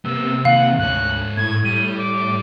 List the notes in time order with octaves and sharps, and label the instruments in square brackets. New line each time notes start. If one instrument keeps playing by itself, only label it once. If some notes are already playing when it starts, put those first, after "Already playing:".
[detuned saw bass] C3 [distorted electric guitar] A#3 B3 [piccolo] E6
[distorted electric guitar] D#3 A#3 [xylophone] F5 [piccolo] F#5
[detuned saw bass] D2 [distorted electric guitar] G#2 C#5 [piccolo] F#6
[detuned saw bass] A2 [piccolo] G#6
[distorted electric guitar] G3 [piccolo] D#7
[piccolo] D6